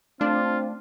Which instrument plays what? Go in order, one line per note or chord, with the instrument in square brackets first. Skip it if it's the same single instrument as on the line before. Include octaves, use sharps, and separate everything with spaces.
[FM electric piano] A3 [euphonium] C4 [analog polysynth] D4 [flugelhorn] F4